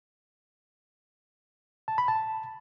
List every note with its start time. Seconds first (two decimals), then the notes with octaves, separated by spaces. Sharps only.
1.88 A5
1.98 B5
2.08 A5